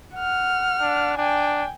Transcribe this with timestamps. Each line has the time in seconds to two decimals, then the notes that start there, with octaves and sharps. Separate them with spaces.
0.15 F#5 F6
0.81 D4
1.18 D4 G5 G#5